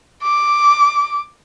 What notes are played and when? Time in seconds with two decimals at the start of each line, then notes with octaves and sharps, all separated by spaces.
0.23 D6